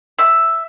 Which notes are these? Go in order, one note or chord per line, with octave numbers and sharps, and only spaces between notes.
E5